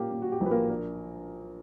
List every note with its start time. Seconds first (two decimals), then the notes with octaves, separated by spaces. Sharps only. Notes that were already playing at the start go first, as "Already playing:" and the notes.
Already playing: A#2 A#3 C#4 G4
0.12 A#3
0.22 F#4
0.32 G4
0.41 A#1 B4
0.51 A#3 A#4
0.69 D4 A#4